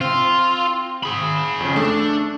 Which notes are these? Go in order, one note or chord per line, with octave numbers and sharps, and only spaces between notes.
C4 F4
G#4 B5
F2 C#3
A3 D4 A4